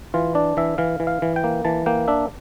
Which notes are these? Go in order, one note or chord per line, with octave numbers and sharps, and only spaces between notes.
E3 F4
D4 D5
E3 E5
E3 F5
E3
F5
E3
G5
A#3
E3 A5
A#3 G5
D4 E5